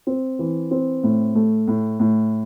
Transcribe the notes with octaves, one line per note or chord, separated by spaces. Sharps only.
C4
E3
C4
A2
A3
A2
A2